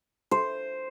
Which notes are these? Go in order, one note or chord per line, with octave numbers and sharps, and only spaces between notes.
C5